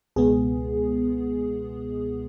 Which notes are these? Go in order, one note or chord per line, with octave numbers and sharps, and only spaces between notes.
C#2 B2 G#3 B3 G#4